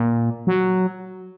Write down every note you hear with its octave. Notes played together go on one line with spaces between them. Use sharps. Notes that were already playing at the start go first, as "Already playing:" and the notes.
Already playing: A#2
F#3